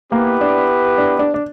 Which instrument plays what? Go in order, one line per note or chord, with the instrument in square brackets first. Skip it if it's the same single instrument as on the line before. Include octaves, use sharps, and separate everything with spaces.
[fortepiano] A#3 [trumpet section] B3 E4 G4 B4
[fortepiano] D4
D4
D4
D4